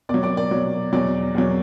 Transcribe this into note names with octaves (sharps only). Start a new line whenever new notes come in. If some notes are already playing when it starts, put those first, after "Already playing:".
B2 D5 D6
F#3
D5 D6
D5 D6
B2 F#3
E2 B2 F#3 D5 D6
E2 B2 F#3